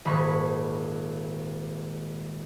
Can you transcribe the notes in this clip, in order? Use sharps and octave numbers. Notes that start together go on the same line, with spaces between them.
D#1 G#1 B5 C#6